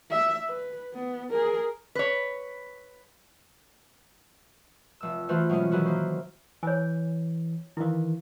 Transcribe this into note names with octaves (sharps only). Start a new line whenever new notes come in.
E5
B4
B3
G#4 A#4
B4 C#5
F1 E6
E3 A3 F4 F#4 B4 C5
B2 F#3 G#3 C#4
B2 D#3 F#3 C#4 E4 F#4
A#3 C5
E3 C#5 G#5
D#3 E3 E4 F5